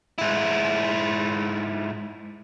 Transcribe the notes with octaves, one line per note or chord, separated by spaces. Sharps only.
G#2 E4